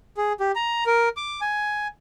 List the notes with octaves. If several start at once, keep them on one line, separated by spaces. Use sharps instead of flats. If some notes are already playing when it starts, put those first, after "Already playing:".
G#4
G4
A#5
A#4
D6
G#5